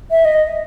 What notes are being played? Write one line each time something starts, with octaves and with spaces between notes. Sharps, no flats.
E5
D#5